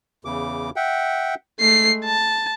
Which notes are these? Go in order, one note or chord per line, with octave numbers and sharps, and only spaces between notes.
E2 C#3 D6
E5 F#5 G5
G#3 A3 C7
A5